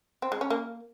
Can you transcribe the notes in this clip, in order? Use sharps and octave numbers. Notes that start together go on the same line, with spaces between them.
C4
G#3
C#4
A#3